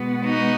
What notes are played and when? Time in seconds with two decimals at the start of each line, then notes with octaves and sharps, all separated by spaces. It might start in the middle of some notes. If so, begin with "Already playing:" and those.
Already playing: B2 G#3 B3
0.25 D#4 F#4